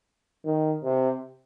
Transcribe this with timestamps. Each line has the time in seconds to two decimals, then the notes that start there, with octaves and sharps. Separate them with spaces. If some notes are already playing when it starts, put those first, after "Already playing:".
0.45 D#3
0.83 C3